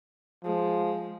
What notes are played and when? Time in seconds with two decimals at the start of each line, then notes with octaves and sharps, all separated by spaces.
0.44 F3 G#3